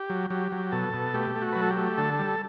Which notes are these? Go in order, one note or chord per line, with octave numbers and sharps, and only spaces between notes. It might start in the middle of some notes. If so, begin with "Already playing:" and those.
Already playing: G4
F#3
F#3 G4
F#3
B2 A4
B2
A3 G4
A3
F#4
F#3 B4
A4
G4
A3
D3 A4
G3